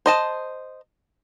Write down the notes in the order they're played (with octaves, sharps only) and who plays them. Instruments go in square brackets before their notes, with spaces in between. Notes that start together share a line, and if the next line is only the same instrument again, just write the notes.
[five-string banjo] C5 D#5 A5